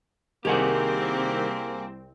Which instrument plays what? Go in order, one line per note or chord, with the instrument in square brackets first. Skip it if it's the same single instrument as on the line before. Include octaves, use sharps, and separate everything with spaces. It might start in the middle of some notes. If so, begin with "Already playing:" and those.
[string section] C2 C4 [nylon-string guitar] D#3 [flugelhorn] A#3 [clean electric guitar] G4 G#4 F#5